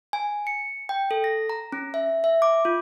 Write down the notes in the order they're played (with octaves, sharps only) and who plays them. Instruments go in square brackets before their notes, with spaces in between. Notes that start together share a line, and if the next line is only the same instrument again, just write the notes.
[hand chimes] G#5
C#7
G5
A4
A#6
A#5
C#4
E5
E5
D6
F4